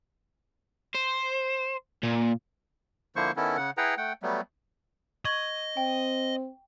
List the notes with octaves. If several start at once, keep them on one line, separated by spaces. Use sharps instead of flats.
C5
A#2
D3 F3 A#3 E4 C5 C#6
D#3 B3 C#4 E4 A4
C#3 F#5
E4 G#4 B4 F#5 G5 A#5
A3 F#5 G5
F#3 G3 A3 B3
D#5 C#6 G#6 F#7
C4 G5